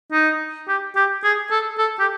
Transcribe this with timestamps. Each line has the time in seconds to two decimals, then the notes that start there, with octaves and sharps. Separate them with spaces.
0.12 D#4
0.68 G4
0.96 G4
1.24 G#4
1.51 A4
1.78 A4
2.00 G4